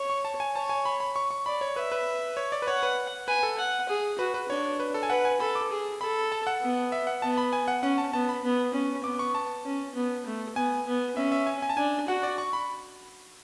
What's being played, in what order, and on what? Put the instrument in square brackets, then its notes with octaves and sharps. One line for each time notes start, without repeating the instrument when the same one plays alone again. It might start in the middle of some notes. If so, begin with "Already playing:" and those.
Already playing: [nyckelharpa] C#5
[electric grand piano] C#6
A5
G#5
[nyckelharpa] C#5 [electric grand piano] A5
[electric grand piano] G#5
B5
B5
C#6
C#6
[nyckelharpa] D5 [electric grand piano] B5
[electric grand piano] C#5
[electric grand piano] B4 [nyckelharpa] E5
[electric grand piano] B4
C#5
D5
B4
[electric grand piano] C#5 [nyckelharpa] F#5
[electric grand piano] B4
[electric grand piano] B4 [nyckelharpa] G#5
[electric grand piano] A4
[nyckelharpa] F#5
G#4
[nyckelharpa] F#4 [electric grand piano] B4
[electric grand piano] B4
[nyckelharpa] D4 [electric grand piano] C#5
[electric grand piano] B4
A4
G#5
[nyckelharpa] B4 [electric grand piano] F#5
[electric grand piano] G#5
[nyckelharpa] A4 [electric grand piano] B5
[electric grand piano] D6
[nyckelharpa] G#4
[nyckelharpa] A4 [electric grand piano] B5
[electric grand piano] A5
F#5
[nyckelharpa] B3
[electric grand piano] E5
F#5
[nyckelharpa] B3 [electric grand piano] A5
[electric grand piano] B5
G#5
F#5
[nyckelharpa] C#4 [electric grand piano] F#5
[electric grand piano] A5
[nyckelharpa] B3 [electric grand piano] A5
[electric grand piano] B5
[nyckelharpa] B3
C#4
[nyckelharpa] B3 [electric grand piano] D6
[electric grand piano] C#6
A5
[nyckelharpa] C#4
B3
A3
[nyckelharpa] B3 [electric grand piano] G#5
[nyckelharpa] B3
[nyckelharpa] C#4 [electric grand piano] E5
[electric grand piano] E5
G#5
G#5
A5
[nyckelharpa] D4 [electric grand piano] G#5
[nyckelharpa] F#4 [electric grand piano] F#5
[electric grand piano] D5
C#6
B5